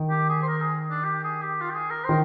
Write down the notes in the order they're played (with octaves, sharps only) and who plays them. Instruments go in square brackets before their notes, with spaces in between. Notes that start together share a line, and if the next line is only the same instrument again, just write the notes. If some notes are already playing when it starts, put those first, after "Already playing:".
Already playing: [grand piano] D#3
[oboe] G4
G#4
C5
A#4
G#4
D4
G4
G#4
G4
F4
G4
G#4
A#4
[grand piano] D#3 [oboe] C5